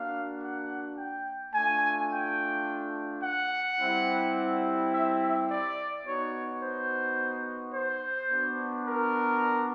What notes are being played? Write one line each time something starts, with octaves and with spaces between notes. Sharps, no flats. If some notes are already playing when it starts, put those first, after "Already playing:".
Already playing: A#3 D4 F#4 F5
F#5
G5
A3 D4 F4 G#5
G5
F#5
G3 C4 E4
E5
E5
D5
B3 D#4 F#4 C#5
C5
C5
B3 D4 F#4
A#4